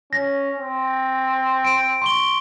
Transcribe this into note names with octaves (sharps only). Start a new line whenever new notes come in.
C#4 A#6
C4
D7
C6 C#6 G7